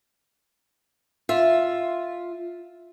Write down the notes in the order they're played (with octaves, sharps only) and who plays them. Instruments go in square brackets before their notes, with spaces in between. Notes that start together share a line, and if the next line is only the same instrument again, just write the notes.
[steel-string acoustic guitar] F4 E5